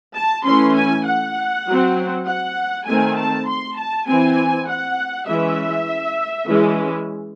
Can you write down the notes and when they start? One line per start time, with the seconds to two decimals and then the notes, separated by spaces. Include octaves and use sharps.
0.15 A5
0.45 E3 A3 C#4 C6
0.76 G#5
1.05 F#5
1.67 F#3 C4
2.26 F#5
2.86 D#3 A3 C4 G#5
3.17 A5
3.47 C6
3.77 A5
4.07 E3 C4 G#5
4.67 F#5
5.27 E3 G#3 C#4 E5
6.48 E3 G#3 C#4